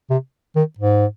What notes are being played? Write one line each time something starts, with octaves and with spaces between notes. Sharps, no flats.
C3
D#3
G#2